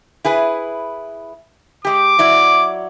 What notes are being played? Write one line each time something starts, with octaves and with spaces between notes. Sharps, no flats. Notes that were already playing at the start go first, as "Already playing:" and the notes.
E4 G#4 B4
G#3 G4 D6
F#3 E4 D5